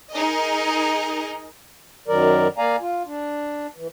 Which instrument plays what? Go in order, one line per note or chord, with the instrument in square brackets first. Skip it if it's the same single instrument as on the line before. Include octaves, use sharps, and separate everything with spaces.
[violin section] D#4 G#4 A#4 D#5
[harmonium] F#2 D#3 F#3 A#4 D5
A#3 D5 F5 G#5 A#5
F4
D4
E3